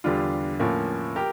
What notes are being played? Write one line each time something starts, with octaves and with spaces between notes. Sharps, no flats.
E2 D3 G3 D4 F4
A2 F3 A#3 C#4
G4 A#4